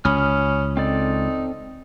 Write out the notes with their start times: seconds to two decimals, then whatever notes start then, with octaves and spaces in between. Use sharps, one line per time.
0.05 C#2 C#4 B5 D#6 F6
0.77 C4 D#4 A4 D5